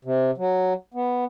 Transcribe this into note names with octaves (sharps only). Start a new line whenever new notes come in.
C3
F#3
B3